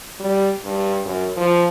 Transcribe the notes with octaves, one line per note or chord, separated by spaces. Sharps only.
G3
G2
F#2
F3